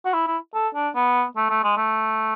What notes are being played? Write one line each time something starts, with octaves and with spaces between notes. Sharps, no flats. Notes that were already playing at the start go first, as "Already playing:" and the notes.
F#4
E4
E4
A4
D4
B3
A3
A3
G#3
A3